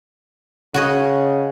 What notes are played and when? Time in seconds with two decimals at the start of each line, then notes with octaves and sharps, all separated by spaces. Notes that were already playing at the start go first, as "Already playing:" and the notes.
0.74 C#3 F#4 C#5 D#5